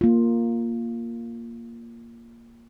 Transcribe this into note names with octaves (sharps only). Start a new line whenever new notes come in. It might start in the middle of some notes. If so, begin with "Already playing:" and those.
A#3 F4